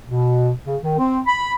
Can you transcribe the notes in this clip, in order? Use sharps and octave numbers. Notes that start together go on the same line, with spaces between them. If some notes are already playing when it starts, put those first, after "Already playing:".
B2
C#3
D#3
C4
B5